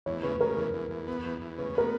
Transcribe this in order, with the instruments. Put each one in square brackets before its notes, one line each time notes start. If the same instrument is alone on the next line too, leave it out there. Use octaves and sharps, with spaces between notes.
[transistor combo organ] E2 [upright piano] C#5
[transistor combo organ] C#3 [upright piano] B4
[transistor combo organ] C#3 [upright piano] A#4
[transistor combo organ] E2
E2
E2
B3
E2
E2
[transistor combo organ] C#3 [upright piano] B4
[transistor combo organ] B3 [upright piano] A#4